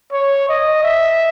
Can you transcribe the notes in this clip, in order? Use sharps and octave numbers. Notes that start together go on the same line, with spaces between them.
C#5
D#5
E5